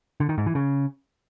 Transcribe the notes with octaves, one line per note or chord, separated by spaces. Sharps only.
D3
D#3
G#2
E3
C#3